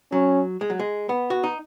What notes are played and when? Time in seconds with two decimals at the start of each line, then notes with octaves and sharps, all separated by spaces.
0.12 F#3 C#4
0.61 G#3
0.70 F#3
0.79 G#3
1.09 B3
1.30 F#4
1.43 D#4